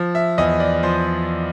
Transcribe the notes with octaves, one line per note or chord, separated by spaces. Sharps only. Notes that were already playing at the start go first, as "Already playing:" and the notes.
Already playing: F3
E5
E2 D#5
D5
F3 C5